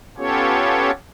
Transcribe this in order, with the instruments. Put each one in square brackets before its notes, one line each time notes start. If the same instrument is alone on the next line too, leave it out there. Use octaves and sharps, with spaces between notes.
[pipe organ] B3 C#4 F4 G4 A4 C#5